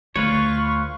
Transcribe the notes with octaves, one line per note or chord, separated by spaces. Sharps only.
D2 F4 B4 C#5 C#6